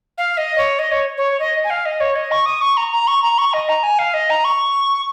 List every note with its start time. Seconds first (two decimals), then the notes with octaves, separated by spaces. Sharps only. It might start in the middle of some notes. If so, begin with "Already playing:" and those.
0.18 F5
0.37 D#5
0.58 C#5
0.79 D#5
0.91 C#5
1.17 C#5
1.40 D#5
1.64 G#5
1.70 F5
1.85 D#5
2.00 C#5
2.15 D#5
2.31 C#6
2.46 D#6
2.61 C#6
2.77 A#5
2.92 A#5
3.07 C#6
3.22 A#5
3.38 C#6
3.53 D#5
3.69 A#5
3.83 G#5
3.99 F5
4.14 D#5
4.30 A#5
4.44 C#6